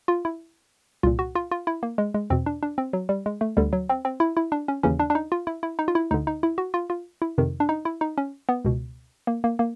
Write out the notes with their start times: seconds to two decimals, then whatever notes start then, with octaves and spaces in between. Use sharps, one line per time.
0.08 F4
0.25 E4
1.03 C2 A#2 F4
1.19 F#4
1.35 F4
1.51 F4
1.67 E4
1.83 A#3
1.98 G#3
2.14 G#3
2.30 E2 B2 C4
2.46 D4
2.63 D4
2.78 C4
2.93 F#3
3.09 G3
3.26 G#3
3.41 A3
3.57 D2 D3 G3
3.73 F#3
3.89 C4
4.05 C4
4.20 E4
4.37 E4
4.52 D4
4.68 C#4
4.83 D#2 C#3 E3 C#4
5.00 D4
5.10 D4
5.15 D#4
5.32 F4
5.47 E4
5.63 E4
5.79 D#4
5.88 F4
5.95 E4
6.11 D2 D3 D#4
6.27 D#4
6.43 E4
6.58 F#4
6.74 F4
6.90 F4
7.22 E4
7.38 F2 C3 D#3
7.60 D4
7.69 D#4
7.85 E4
8.01 D#4
8.18 C#4
8.49 B3
8.65 C#2 B2
9.27 A#3
9.44 A#3
9.59 A#3